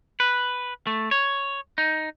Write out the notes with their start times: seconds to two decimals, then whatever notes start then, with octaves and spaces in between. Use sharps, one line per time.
0.20 B4
0.87 A3
1.11 C#5
1.78 D#4